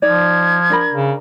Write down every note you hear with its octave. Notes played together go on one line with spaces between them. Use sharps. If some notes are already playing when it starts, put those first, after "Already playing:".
F3 D#4 D5 G#6
D4 A#4 B5
C#3